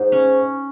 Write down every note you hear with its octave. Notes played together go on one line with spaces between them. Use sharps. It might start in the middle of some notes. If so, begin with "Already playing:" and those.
Already playing: G#2 D#4
C#4